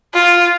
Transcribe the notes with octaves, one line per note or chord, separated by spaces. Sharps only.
F4